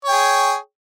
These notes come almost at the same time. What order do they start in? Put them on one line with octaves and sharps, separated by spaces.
C#5 G5 G#4